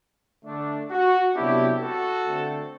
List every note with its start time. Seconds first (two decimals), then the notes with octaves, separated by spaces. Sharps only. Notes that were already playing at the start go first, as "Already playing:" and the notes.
0.45 D3 A3 D4
0.90 F#4
1.35 C3 F#3 B3 D4 E4 G4
1.81 F#4 A4
2.26 D3 A3 C4